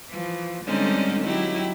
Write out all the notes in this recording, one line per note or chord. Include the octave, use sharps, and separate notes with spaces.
E3 F3
D3 G3 G#3 C4 C#4 D#4
F#3 D#4 E4 G4